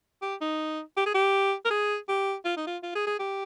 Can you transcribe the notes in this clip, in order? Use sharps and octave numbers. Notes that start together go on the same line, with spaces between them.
G4
D#4
G4
G#4
G4
A#4
G#4
G4
F4
D#4
F4
F4
G#4
G#4
G4